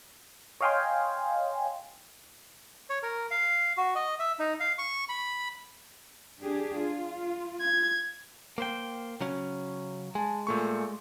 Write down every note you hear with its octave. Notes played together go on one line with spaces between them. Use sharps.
C#5 D#5 F5 G5 G#5 C6
C#5
A#4
F5
F#4
D#5
E5
D#4
F5
C#6
B5
D4 G4 G#4
F4
G#6
A#3 C5 G5
C#3 F#3 C#4
G#3 G#5 A5
A#2 A3 C#6